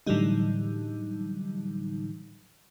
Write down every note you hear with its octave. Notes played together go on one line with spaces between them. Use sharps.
A2 D3 E3 F#3 G3 D#4